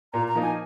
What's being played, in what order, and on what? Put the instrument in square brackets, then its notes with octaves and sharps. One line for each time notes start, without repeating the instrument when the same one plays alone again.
[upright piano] A#2 [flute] A#5
[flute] A#5
[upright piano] F3 A#3 D#4
[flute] G#5